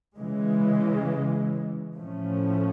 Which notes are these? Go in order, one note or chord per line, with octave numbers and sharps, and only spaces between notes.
C#3 E3 G#3
A2 F3 A3 C#4